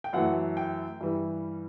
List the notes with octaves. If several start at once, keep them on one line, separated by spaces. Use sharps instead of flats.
G5
F#2 E3 A3 F#5
G5
G2 E3 G3